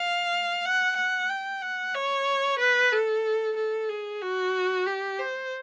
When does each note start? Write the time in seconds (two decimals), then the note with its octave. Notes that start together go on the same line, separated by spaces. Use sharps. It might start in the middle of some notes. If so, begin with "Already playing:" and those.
Already playing: F5
0.65 F#5
0.97 F#5
1.30 G5
1.62 F#5
1.95 C#5
2.59 B4
2.92 A4
3.56 A4
3.89 G#4
4.22 F#4
4.86 G4
5.19 C5